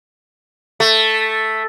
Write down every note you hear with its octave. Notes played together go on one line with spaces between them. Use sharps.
A3